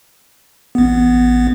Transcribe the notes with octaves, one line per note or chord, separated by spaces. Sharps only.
A1 B3